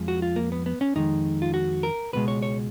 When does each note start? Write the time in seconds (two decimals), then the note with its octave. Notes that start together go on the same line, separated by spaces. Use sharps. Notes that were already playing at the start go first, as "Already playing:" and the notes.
Already playing: F2 F3 G#3
0.08 F#4
0.22 F4
0.36 A#3
0.52 B3
0.66 B3
0.81 C#4
0.96 F2 D#3 G#3 D#4
1.42 F4
1.54 F#4
1.83 A#4
2.13 C#2 B2 G#3 B4
2.28 C#5
2.42 C#5